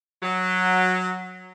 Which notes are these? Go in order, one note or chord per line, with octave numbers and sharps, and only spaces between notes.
F#3